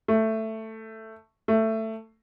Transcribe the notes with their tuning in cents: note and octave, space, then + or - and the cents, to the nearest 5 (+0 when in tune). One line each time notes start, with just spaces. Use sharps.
A3 +10
A3 +15